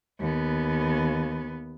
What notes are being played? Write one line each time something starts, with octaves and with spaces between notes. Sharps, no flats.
D#2 B3